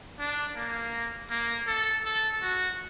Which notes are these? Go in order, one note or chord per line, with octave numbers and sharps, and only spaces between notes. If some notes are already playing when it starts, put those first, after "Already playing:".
D4
A#3
A#3
A4
A4
F#4